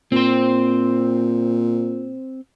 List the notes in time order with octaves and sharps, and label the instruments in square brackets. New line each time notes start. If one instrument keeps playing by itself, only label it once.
[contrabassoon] A#2 [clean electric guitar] C4 C5